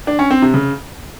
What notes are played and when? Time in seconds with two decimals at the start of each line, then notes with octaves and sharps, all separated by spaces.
0.07 D4
0.19 C#4
0.30 C4
0.42 C3
0.54 C#3